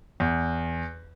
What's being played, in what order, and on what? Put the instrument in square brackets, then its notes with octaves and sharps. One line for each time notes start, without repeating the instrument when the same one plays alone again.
[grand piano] E2